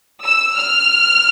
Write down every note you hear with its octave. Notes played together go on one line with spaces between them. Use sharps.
E6
F6